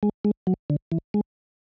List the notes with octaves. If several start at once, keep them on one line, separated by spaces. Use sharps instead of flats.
G#3
G#3
F#3
D3
E3
G#3